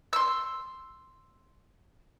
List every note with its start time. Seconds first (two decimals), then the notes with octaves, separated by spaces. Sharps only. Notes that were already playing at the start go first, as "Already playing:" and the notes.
0.13 C6 E6